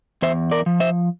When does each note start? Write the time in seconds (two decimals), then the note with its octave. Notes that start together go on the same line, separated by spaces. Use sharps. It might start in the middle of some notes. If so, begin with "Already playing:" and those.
0.22 E2 C5 E5
0.51 A#4 D5
0.66 F3
0.80 C5 E5